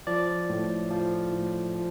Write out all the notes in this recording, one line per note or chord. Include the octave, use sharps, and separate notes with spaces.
F3 D5
A2
F3
A2
F3